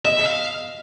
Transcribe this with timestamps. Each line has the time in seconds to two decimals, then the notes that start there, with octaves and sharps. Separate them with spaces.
0.05 D#5 E5
0.26 F5